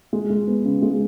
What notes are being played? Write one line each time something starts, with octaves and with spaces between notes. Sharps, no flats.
G#3
G#3
B3
C#3
G#3